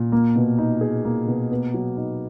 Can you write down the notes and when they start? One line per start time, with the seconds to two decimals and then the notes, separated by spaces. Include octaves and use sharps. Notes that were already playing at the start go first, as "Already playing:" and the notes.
Already playing: A#2
0.12 A#3
0.36 B2
0.58 D#4
0.81 G#4
1.05 A#3
1.27 B2
1.51 B3
1.74 F#3
1.97 D#4